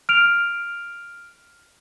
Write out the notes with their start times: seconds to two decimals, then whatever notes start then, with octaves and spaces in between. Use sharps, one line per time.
0.09 F6 D7 F7